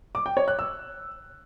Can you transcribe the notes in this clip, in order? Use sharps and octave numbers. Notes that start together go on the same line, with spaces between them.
D6
G5
C#5
F#6
E6